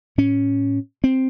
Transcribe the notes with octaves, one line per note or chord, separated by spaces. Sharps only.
A2 C#4
C4